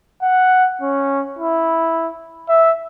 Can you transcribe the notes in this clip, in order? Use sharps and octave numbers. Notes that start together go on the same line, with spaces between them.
F#5
C#4
E4
E5